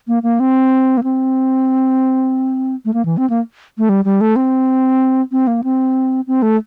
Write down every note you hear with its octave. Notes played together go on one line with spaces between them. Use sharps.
A#3
A#3
C4
A#3
C4
A3
A#3
E3
C4
A#3
A3
G3
G3
A3
C4
C4
A#3
C4
C4
A3